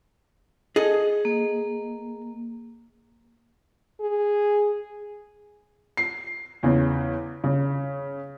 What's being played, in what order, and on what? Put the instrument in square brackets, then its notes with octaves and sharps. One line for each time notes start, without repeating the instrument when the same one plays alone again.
[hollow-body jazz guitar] G#4 A4 D#5
[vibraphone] A#3
[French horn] G#4
[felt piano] C7
E2 C#3
C#3